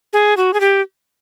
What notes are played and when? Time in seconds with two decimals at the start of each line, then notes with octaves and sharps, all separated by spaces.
0.13 G#4
0.37 F#4
0.54 G#4
0.60 G4